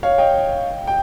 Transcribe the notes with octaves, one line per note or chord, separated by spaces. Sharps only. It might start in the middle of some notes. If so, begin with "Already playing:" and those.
C#5 F5
D#5 G5
G5